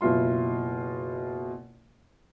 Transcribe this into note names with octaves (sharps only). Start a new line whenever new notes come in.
F#1 B2 E4 F4 C6